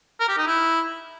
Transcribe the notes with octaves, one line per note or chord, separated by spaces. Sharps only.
A#4
G4
D#4
E4